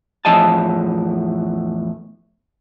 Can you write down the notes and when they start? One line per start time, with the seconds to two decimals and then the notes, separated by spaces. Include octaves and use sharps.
0.25 E2 A2 F3 D#5 G#5 A5